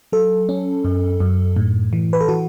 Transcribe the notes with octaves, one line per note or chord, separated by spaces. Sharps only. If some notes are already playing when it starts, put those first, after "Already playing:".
F#3 A4
C#4
F#2
F#2
A2
E3
B4
A4
E3 F#4